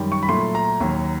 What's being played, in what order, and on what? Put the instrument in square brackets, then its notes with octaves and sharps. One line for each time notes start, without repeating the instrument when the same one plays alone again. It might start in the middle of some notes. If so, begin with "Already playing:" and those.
Already playing: [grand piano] F#2 D#3 G3
C#6
B5
A#2 F#3 A3 C6
A#5
D#2 D#3 F#3